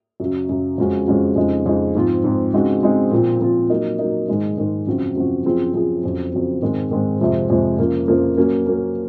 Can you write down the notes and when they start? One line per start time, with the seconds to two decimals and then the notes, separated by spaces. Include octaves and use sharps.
0.20 F#2 C#3 F#3
0.49 F#2 C#3 F#3
0.78 F2 C#3 G#3 C#4 F#4
1.07 F2 C#3 G#3 C#4 F#4
1.36 F2 C#3 G#3 D#4
1.66 F2 C#3 G#3 D#4
1.95 G#2 F3 C4 F4
2.24 G#2 F3 C4 F4
2.53 C#3 G#3 C4 D#4 F#4
2.82 C#3 G#3 C4 D#4 F#4
3.11 A#2 F3 C4 F4
3.40 A#2 F3 C4 F4
3.70 F#3 A#3 D#4
3.99 F#3 A#3 D#4
4.29 G#2 D#3 G#3 D#4
4.58 G#2 D#3 G#3 D#4
4.87 F#2 C#3 F3 C4 F#4
5.16 F#2 C#3 F3 C4 F#4
5.45 F#2 F3 C4 F4 G#4
5.74 F#2 F3 C4 F4 G#4
6.03 F2 C#3 F#3 C4
6.32 F2 C#3 F#3 C4
6.62 G#2 D#3 G#3 C4
6.91 G#2 D#3 G#3 C4
7.20 F2 C3 F3 G#3
7.50 F2 C3 F3 G#3
7.78 F2 C#3 F3 A#3
8.08 F2 C#3 F3 A#3
8.37 F#3 A#3 C#4
8.66 F#3 A#3 C#4